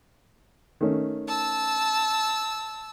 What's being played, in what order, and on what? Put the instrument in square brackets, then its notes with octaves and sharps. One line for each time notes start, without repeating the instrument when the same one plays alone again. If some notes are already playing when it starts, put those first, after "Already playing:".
[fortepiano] D#3 A3 C#4
[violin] A5 E6